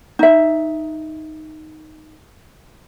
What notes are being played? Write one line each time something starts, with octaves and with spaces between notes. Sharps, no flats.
D#4 E5